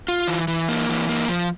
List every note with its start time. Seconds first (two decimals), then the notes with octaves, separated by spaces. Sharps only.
0.08 F4
0.28 E3
0.48 E3
0.68 A#3
0.89 E3
1.09 A#3
1.28 F3